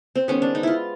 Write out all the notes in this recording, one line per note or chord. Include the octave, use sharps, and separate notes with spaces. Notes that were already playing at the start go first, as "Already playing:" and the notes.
C4
D#3 G#3 B3 C#4
D4
D#4
E4 F4